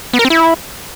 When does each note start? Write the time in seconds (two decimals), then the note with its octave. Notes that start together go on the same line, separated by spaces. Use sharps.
0.13 B3
0.19 A#4
0.25 C4
0.30 E4